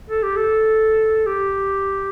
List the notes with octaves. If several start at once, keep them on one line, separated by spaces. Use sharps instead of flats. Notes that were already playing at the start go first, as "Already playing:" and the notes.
A4
G4
A4
G4